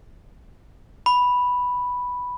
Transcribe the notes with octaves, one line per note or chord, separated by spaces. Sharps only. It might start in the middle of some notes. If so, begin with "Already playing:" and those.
B5